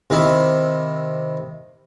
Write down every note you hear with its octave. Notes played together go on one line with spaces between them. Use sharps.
C3 D#3 E4